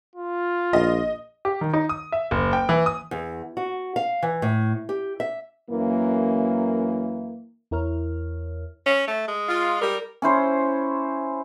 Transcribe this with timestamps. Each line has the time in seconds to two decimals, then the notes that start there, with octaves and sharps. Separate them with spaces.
0.16 F4
0.73 A#1 D#5
1.45 G4
1.61 D#3
1.73 D#4
1.89 D#6
2.12 E5
2.31 F#1
2.53 G5
2.69 E3
2.86 D#6
3.11 E2
3.57 F#4
3.96 F5
4.23 E3
4.42 A2
4.89 G4
5.20 E5
5.69 F#2 E3 A#3
7.71 E2 E4 A#4 C#5 F6
8.86 C#4
9.08 A3
9.28 G#3
9.48 F4
9.82 G3 A#4
10.22 C#4 E4 C5